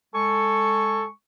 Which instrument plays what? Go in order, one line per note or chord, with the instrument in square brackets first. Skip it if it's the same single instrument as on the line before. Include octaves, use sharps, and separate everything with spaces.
[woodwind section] G#3 G#5 C#6 [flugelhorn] A4